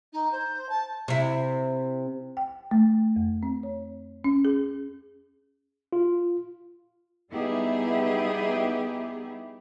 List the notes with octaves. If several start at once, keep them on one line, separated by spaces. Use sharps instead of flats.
D#4
C5
A5
C3 E4
G5
A3
F2
C4
C#5
C#4
G#4
F4
G3 B3 D#4 E4 G4 G#4